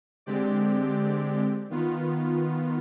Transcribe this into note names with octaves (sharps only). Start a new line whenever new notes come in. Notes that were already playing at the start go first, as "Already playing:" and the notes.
D3 G#3 C4 G4 D5
D#3 B3 F4